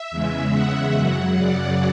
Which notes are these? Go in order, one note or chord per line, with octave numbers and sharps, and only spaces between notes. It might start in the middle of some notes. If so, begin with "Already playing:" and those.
Already playing: E5
E2 C#3 G#3
F#5
F#2 C#3 F#3
D5